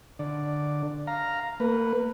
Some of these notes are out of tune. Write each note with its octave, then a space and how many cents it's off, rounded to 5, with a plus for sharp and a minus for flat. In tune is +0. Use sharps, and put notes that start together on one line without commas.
D3 +15 D5 +0
F5 +0 A#5 +0
A#3 -30 B4 +0